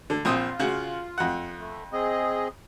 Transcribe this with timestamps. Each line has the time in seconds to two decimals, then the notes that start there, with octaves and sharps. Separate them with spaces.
0.10 D3
0.25 A#1 C4 F4 D#6
0.59 C#3 F#4
1.18 F2 F#5
1.60 A3
1.93 C4 G#4 D#5